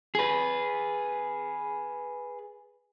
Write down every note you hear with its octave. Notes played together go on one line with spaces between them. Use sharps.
G#4 B4